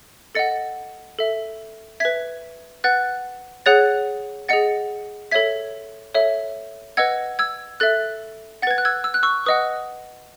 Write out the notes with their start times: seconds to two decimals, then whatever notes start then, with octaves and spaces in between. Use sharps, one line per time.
0.35 A4 D#5 F#5 A6 C#7
1.19 A4 E5
2.00 B4 E5 G#6 B6
2.84 B4 F#5 F#6 A6
3.66 G#4 C#5 F#5 F#6 A6
4.49 G#4 D#5 F#5 A6 C#7
5.31 A4 C#5 E5 G#6 B6
6.15 A4 C#5 E5
6.97 B4 D#5 F#5 E6 G#6
7.39 E6 G#6
7.80 A4 E5 F#6 A6
8.62 F#5 A6
8.67 B4 G#6
8.78 F#6
8.85 E6 G#6
9.04 E6
9.14 F#6
9.23 C#6 E6
9.46 B4 D#5 F#5 D#6 F#6